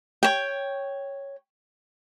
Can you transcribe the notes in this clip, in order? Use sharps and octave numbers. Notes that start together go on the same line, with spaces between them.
C#5 G5